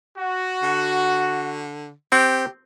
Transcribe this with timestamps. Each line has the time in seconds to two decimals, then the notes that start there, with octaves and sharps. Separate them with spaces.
0.18 F#4
0.62 D3
2.12 C4 G4